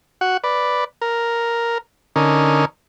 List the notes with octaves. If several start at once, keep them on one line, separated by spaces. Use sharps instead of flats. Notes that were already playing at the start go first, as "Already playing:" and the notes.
F#4 F#5
B4 D5
A#4
D3 C#4 D#4 A#4